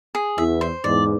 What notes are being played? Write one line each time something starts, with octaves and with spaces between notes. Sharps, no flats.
G#4
E2 E5
C5
E2 G#2 D5